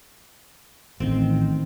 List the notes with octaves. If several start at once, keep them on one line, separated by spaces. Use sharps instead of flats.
A1 D#3 C4